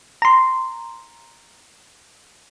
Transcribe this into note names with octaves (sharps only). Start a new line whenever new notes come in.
A#5 C6